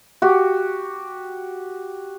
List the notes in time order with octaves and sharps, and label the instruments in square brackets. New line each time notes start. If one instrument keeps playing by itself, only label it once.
[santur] F#4 G4